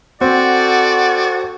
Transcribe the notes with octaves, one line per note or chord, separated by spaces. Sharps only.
C4 F#4 A4 D5 F#5